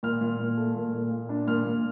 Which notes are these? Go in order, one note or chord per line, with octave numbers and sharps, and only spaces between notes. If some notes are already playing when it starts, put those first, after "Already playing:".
A#2 F6
A#2
A#2
A3
A#2
A#2
A#2
D4
A#2 F6
A#2